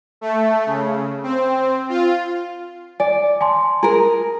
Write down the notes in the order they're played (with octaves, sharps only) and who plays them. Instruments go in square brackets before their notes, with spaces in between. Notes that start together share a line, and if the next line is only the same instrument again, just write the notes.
[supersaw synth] A3
C#3
C4
F4
[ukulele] D5 [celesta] G#5
[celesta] G#5 A5 C6
[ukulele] G#4 A#4 [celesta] A#5